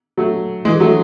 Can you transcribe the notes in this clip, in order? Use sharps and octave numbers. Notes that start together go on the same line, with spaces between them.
F#3 A3
E3 G#3
F#3 A3